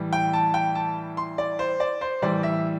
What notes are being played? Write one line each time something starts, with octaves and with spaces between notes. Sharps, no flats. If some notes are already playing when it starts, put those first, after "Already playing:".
Already playing: A2 E3 G3
G5
A5
G5
A5
C6
D5
C5
D5
C5
A2 E3 G3 D5
E5